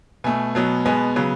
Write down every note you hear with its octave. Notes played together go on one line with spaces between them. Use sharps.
B2 A3 G#5
B2 F#3 B3
B2 G#3 B3 G#5
C#3 F#3 B3